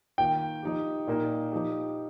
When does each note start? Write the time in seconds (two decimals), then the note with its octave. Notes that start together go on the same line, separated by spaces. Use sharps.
0.18 D#3 A#3 F4 G5
0.62 F3 D#4 G4
1.07 A#2 A#3 D#4
1.52 F3 D#4 G4